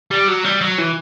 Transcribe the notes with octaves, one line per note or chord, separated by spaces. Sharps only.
G3
F#3
G3
F#3
E3